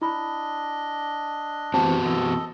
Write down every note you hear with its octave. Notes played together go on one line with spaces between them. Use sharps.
D4 E4 D#5 B5
E3 B3 C4 F#4 C5 A5
A4 D#5